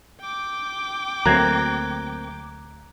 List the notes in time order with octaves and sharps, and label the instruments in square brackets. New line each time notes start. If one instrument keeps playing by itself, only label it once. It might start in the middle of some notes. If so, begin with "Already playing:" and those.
[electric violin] G5 D6
[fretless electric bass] D2 F#3 [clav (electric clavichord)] A#3 C4 [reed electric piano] A#5 F#6 G#6